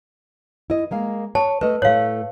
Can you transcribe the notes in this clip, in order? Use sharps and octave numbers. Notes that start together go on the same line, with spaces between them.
E4 D#5
G#3 A#3 F5
C#5 A5
A3 B4 D#5
A2 A3 C#5 F5